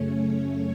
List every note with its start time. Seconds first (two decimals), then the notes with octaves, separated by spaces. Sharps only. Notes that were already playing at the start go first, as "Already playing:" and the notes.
Already playing: F#2 C#3 A3 C#4 C#5
0.10 C#5